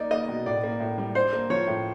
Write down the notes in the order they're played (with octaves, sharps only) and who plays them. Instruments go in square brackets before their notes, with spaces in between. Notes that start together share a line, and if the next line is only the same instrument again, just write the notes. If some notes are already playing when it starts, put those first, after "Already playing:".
Already playing: [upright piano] A#3 D#4 [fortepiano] D5
[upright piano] A#3 [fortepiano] D#5
[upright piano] B2
[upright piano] A2 [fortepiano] D5
[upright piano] A#3
A2
G3
[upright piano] D4 [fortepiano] C5
[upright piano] A#3
[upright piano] F3 [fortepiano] C#5
[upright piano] A2